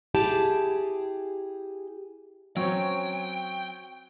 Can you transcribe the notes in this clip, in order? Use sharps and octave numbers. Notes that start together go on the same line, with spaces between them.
E4 G4 G#4 A5
F#3 C4 C#4 G5